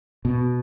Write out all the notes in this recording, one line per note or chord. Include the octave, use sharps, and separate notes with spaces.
B2